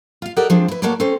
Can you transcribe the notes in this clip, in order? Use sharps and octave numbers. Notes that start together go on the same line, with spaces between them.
F4 F5
G4 A4 A#4 D5 D#5 F#5
F3 G#3 C4 D4
E4 B4
A2 A#3 F#4 A4 C#5 D5
C4 C#4 A4 C5